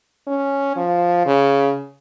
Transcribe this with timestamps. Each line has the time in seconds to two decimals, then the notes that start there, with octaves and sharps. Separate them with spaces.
0.27 C#4
0.76 F3
1.26 C#3